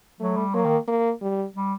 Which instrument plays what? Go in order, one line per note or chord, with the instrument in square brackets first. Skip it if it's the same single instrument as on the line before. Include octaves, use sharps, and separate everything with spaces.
[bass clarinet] F#3 [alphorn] A3
[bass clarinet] G3
[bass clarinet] F#3 [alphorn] A#3
[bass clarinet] D#3
[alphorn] A#3
G3
[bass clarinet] G3